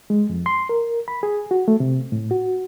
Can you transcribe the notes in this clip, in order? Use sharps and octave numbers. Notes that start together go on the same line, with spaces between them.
G#3
F2
C6
A#4
B5
G#4
F#4
A3
C3
A2
F#4